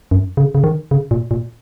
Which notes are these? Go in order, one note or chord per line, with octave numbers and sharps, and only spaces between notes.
F#2
C#3
C#3
D#3
C#3
A#2
A#2